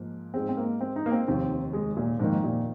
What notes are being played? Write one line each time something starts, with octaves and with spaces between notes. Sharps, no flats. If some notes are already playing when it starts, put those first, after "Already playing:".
Already playing: G#2 F3 A#3
G#2 G#3 C4 F4 G#4
C4
A#3
C4
D#4
A#3
C4
F1 D#2 D#3 C4
G#3
A#2
F2 G#2 D#3 A#3
A#2